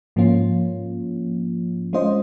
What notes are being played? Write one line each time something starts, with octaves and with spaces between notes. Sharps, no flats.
G#2 F3 A#3 C#4 F4
G#3 C#4 F4 C5 D#5